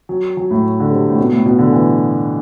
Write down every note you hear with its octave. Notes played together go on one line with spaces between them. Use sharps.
F#3
F#3
A2
D3
C3
A2
B2
A2
B2
D3
E3